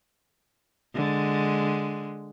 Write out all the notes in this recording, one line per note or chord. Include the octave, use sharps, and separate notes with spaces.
D3 G#3